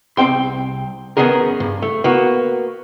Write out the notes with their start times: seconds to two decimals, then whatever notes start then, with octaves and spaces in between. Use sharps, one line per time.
0.17 C2 G#3 C4 G5 C6
1.17 F#2 D#3 B3 C#4 G#4 A#4
1.60 G2
1.82 A3
2.04 A#3 B3 F#4